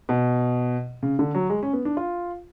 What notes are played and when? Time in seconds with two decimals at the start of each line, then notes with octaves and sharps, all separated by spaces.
0.09 B2
1.03 C#3
1.19 D3
1.35 F#3
1.50 G#3
1.63 C#4
1.73 B3
1.85 D4
1.97 F4